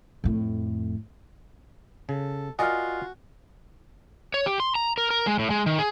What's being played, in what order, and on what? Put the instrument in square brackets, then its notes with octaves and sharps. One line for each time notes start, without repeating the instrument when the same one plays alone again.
[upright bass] F2 A2
[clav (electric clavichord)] C#3 [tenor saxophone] A4
[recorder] F4 [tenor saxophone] F#4 [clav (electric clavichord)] A#4 D5 D#5 [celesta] G#5 F6
[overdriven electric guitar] C#5
G4
C6
A#5
A#4
A#4
G#3
A2
G#3
D#3
G#4